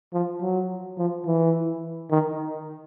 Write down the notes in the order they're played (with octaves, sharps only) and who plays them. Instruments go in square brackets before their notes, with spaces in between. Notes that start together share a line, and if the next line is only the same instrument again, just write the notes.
[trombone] F3
F#3
F3
E3
D#3